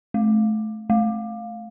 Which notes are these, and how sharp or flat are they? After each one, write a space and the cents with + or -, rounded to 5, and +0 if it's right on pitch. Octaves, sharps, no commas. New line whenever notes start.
A3 -25
A3 -20